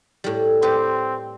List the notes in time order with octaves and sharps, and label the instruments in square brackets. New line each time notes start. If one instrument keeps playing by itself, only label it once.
[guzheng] A2 G3
[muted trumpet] C4 [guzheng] G4 B4